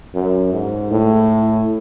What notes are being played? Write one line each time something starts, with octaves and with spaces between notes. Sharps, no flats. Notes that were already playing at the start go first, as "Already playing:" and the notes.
F#2
G#2
A2